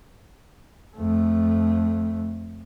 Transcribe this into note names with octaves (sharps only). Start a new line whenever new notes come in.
F2 A3